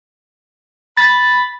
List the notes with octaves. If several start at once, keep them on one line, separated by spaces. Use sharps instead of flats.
B5 A6